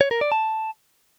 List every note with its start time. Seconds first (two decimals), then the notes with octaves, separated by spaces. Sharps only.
0.01 C#5
0.11 A#4
0.21 D5
0.32 A5